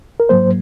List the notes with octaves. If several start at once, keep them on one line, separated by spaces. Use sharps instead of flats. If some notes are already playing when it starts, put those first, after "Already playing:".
A#4
G#2 F#3 A#3 C5